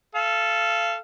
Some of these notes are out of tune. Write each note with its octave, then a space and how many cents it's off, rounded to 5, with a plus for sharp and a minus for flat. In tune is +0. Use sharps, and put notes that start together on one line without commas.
A4 -10 F5 -25